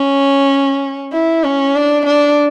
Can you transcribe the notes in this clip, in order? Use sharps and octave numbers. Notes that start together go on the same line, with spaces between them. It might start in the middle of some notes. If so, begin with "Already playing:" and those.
Already playing: C#4
E4
C#4
D4
D4